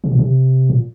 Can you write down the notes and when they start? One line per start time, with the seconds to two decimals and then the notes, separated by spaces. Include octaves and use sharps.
0.04 C3
0.12 A#2
0.19 C3
0.70 A#2